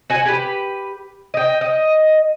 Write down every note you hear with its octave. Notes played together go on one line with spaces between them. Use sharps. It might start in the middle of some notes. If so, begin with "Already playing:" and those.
F#4 F#5 G#5
G4 B4
D#5 G5
D#5